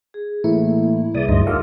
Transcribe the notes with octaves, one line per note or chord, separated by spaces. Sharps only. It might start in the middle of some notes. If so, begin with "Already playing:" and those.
G#4
A2 E3 A3 A#3 E4
C2 G#4 B4 D5 E5 D#6
D2 G2 F#3 D#4 D#5 C6
E4 F#4 A4 A#4 F5 D6 F6